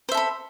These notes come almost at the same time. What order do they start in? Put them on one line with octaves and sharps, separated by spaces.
C5 E5 A4 B5